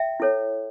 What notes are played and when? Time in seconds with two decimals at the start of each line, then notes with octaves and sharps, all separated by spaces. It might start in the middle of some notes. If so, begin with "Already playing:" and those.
Already playing: E5 G5
0.20 E4 A4 C#5